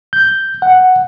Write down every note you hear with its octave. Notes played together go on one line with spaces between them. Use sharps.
G6
F#5